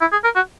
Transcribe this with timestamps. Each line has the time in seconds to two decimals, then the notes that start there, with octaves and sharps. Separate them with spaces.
0.01 E4
0.12 G#4
0.24 A#4
0.36 F#4